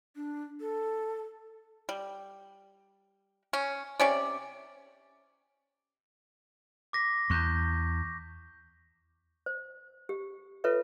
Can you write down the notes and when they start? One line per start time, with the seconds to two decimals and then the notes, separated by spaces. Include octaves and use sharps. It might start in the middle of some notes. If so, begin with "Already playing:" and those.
0.16 D4
0.61 A4
1.89 G3
3.53 C#4
4.00 C3 C#4 D5
6.93 D6 A#6 B6
7.30 E2 C#6 G6
9.46 C5
10.09 G4
10.64 F4 A4 B4 C#5 E5